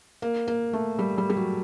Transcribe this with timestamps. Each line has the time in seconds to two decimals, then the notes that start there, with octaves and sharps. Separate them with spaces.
0.22 A#3
0.48 A#3
0.73 A3
0.99 G3
1.18 G3
1.30 G3
1.37 F#3